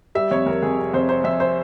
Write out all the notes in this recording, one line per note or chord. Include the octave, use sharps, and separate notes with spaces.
G3 E5
F2 C#5
F2 A#4
F2 G#4
C3
F2 C5
C3 C5
F2 E5
C5